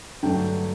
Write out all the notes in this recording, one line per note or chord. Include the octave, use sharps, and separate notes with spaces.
G2 D3 F#3 A3 G5